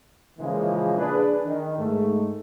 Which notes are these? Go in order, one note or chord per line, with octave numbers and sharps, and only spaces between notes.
A#2 C#3 E3 F3 G#3 A#3
D4 G#4 B4
D#3
G#2 A3